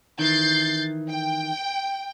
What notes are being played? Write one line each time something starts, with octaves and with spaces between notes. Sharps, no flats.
D#3 E3 G6 A6 C7
G5